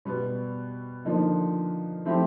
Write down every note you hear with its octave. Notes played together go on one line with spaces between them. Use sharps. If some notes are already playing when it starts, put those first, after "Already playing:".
B2 G3 B3
D3 F3 A#3 D#4
F3 A3 C4 E4 G4